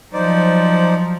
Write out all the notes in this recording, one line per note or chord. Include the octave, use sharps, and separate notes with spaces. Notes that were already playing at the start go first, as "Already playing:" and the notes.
F3 F#3 D#4 C5 D5